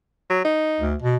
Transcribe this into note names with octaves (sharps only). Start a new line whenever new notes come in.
F#3
D#4
D2
B2